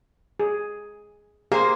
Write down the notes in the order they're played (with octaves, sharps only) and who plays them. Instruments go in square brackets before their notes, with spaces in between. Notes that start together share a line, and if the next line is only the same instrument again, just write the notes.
[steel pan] G#4
[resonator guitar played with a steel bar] A#3 C5 [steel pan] G4 G#4 F5